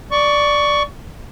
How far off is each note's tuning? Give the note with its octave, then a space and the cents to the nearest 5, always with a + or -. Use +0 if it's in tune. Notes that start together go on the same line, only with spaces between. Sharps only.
D5 +0 C#6 +15